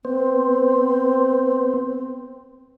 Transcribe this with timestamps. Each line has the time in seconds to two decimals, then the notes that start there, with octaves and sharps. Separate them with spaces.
0.05 B3 C4 C5